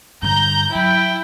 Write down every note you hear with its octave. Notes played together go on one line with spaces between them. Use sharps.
G2 D3 A#5 G6
F#3 E4 G5